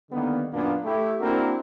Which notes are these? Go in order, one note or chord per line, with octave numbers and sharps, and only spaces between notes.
D3 D#3 G3 A#3 B3
F#2 A#2 A#3 B3 D4
A3 E4 G4
A#3 C4 D4 E4 F#4 A#4